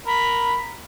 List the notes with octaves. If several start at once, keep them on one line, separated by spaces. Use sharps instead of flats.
A#4 B5